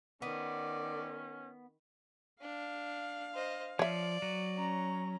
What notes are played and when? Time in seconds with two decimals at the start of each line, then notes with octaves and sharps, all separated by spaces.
0.22 D#3 B3 C#4 D5
2.41 D4 F5
3.34 C5 D#5
3.79 F3 C#5 D5 E5
4.22 F#3
4.56 C#4 A#5